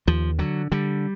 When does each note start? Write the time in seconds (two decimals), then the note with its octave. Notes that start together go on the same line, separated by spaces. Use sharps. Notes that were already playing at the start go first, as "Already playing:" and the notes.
0.07 D#2 F3
0.39 D3 F#3
0.72 D3 G3